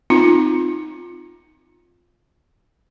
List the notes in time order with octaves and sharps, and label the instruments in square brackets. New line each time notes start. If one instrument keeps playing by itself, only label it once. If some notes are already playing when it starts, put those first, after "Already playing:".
[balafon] C4 D#4 F4